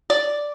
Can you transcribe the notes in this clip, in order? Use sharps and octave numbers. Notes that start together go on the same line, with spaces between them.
D5